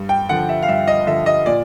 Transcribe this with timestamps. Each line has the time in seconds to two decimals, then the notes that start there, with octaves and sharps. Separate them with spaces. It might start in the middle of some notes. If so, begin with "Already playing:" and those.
Already playing: G2
0.09 G5
0.29 D3 F3 F#5
0.49 E5
0.62 F5
0.68 G2 E5
0.87 D#5
1.07 D3 F3 E5
1.26 D#5
1.46 A#2 D5